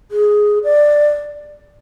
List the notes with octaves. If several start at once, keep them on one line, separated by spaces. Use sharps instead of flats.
G#4
D5